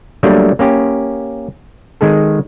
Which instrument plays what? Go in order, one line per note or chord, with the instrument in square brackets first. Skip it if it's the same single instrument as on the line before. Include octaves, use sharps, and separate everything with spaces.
[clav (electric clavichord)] F#3 G3 A3 A#3 D4
A#3 C#4 G4
D#3 G#3 G#4 A4